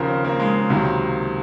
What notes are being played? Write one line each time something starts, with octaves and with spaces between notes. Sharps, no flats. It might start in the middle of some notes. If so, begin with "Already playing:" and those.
Already playing: D#2 C#3 F3 A#4 C5
C4
A#3
G#3
A#3
C#2 C3 D#3 F#3